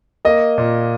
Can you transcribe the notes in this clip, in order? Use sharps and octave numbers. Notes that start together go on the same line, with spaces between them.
A#3 D#5
A#2